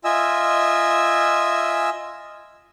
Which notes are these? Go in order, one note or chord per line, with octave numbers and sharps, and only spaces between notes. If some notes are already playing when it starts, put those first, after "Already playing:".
F4 D#5 E5 G#5 E6